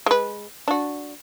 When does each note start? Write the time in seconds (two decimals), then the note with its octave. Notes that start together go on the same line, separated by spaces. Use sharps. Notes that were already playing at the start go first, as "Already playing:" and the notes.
0.06 G#3 B4
0.68 D4 F#4